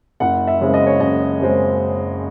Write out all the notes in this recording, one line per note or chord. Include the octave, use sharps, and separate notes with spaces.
F#1 F#5
E5
F#2 C#3 G#3 C4
D#5
C#5
F#1 D#5
F#2 C#3 G#3 C4